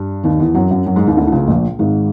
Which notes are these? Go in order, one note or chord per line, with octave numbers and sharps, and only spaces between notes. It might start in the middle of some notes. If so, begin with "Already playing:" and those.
Already playing: G2 G3
D#2 D#3
E2 E3
F#2 F#3
F#2 F#3
F#2 F#3
G#2 G#3
D#2 D#3
D2 D3
D3
C#2 C#3
A#1 A#2
G#1 G#2